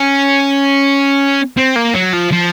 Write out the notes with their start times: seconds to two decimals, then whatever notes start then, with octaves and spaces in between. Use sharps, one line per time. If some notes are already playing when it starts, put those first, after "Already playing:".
Already playing: C#4
1.57 C4
1.76 A#3
1.94 F#3
2.13 F3
2.32 F3